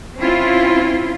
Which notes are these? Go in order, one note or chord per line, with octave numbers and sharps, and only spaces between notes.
C4 C#4 E4 F4